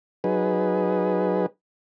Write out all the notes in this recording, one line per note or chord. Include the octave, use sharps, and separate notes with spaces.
F#3 D#4 G#4 B4